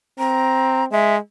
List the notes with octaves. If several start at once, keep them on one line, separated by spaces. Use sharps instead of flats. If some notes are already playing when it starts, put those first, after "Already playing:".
C4 A#5
G#3 E5